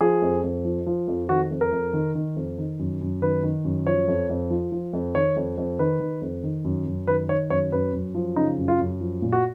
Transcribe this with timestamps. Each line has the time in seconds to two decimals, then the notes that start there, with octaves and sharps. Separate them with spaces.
0.01 F3 G#4
0.22 F2
0.44 F2
0.65 F3
0.86 F3
1.08 F2
1.29 D#3 F#4
1.51 F2
1.61 A#4
1.72 F2
1.93 D#3
2.15 D#3
2.36 F2
2.58 D#3
2.79 F#2
3.01 F#2
3.22 D#3 B4
3.43 D#3
3.65 F#2
3.86 F3 C#5
4.08 F2
4.29 F2
4.50 F3
4.72 F3
4.93 F2
5.15 D#3 C#5
5.36 F2
5.58 F2
5.79 D#3 B4
6.00 D#3
6.22 F2
6.43 D#3
6.65 F#2
6.86 F#2
7.07 D#3 B4
7.29 D#3 C#5
7.50 F#2 C#5
7.72 F#2 B4
7.93 F#2
8.14 F3
8.36 C#3 D#4
8.58 F#2
8.68 F4
8.79 F#2
9.00 F3
9.22 A#2
9.32 F#4